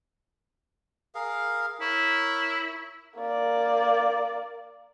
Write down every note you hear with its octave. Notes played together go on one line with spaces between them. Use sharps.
G#4 A#4 F5
E4 A#4 C#5
A#3 D5